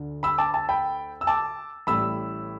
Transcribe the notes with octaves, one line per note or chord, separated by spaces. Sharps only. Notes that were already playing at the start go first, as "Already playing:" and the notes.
Already playing: D2 D3 D4
B5 E6
A5 D6
A5
G5 B5
E6
A5 D6
A1 A2 G3 B5 E6